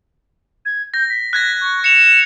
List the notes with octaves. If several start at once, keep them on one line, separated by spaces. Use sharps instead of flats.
G#6
G6 A#6
B6
F#6 G#6 A#6
C#6
C#7 E7 F7